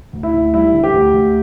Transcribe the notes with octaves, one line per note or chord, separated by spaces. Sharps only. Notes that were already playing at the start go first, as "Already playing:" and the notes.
D2
E4
D2
G3 E4
D3
G4
D2
D2